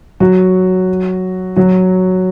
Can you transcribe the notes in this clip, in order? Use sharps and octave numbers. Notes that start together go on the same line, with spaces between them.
F#3 F#4
F#3 F#4